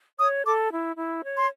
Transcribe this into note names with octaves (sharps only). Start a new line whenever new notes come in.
C#5 D#6
A4 D6
E4
E4
C#5
C6